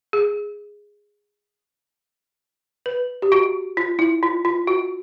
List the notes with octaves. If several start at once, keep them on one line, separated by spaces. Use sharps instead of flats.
G#4
B4
G4
F#4
F4
E4
F4
F4
F#4